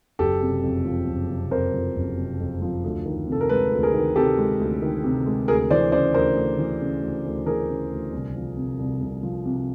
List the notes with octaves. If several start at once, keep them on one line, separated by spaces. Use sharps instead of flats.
F#1 G4 A4
C3
F2
F3
F#1
C3
F2 A#4 C5
F3
F#1
C3
F2
F3
D2
D#3
C3 A4
A#4
G#3 A4 B4
D2
G#4 A#4
D#3
C3 G4 A4
G#3
D2
D#3
C3
G#3
D2 G#4 A#4
E3 C5 D5
C#3 C5 D5
D2 A#4 C5
D2
E3
C#3
D2
D2
E3 G#4 A#4
C#3
D2
C2
F3
C3
C2
C2
F3
C3